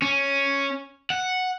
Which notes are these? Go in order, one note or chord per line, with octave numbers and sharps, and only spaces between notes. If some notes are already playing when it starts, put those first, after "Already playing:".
C#4
F#5